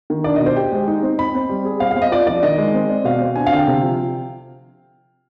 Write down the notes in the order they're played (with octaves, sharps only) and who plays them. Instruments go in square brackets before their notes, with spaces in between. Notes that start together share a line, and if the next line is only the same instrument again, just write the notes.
[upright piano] D#3
[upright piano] D4 [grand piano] D5
[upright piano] B2 [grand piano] D#5
[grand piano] C5
[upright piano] G4 [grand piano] G5
[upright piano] G#3
D#4
C4
[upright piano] D#5 [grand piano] B5
[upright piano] C4
G3
G#4
[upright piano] C4 [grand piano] F5
[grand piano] F5
[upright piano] C4
[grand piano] D#5
[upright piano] F4 [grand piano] D5
[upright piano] F3 [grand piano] D5
[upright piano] D#3 [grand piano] D#5
[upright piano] G#3
C4
D5
[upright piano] B2 [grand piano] F5
[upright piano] C4
[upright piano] D4 [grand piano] G#5
[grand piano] F5
[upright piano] D3 [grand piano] G5
[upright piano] C3
F3